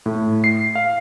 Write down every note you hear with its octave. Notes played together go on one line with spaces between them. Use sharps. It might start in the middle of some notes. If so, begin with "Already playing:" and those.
A2
C7
F5